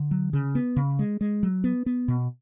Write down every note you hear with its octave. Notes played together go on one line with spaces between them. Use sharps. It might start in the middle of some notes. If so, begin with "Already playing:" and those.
Already playing: D3
F#3
C#3
B3
C#3
G#3
G#3
F#3
B3
B3
B2